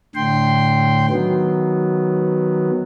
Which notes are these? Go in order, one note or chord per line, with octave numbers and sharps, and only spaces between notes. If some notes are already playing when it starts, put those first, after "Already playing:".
A2 D3 G5 C6
D#3 F#3 B3